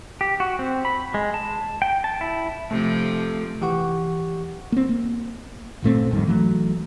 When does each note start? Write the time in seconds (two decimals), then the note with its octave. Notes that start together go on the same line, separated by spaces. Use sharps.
0.21 G4
0.40 F#4
0.59 C4
0.85 B5
1.14 G#3
1.34 A5
1.82 G5
2.04 A5
2.21 E4
2.71 C3 F3 A3
3.62 E3 G4 F#5 C#6
4.72 A#3 C4
4.89 A#3
5.82 G1 A#2 A3 C4
6.11 G#1 F2 D#3 G3
6.27 E3 F#3 A3